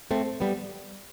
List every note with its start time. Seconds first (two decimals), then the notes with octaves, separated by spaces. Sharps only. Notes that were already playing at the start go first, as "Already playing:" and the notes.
0.11 A3 C4
0.40 G3 B3